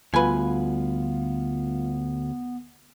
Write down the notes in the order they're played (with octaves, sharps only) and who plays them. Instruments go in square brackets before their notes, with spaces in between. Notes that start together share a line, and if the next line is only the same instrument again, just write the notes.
[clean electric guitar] D2 [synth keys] G3 F4 F5 [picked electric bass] B3 [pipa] B4 G#5